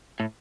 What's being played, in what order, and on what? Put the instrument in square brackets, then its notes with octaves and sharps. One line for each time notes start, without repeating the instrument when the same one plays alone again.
[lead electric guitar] A2